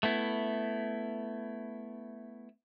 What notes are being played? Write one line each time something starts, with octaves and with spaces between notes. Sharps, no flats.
A3 B3 E4